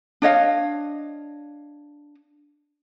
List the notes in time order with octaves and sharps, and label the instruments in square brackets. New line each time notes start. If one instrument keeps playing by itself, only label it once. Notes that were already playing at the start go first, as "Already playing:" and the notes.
[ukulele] D4 C#5 D#5 F5